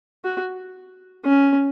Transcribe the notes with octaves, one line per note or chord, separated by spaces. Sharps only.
F#4
C#4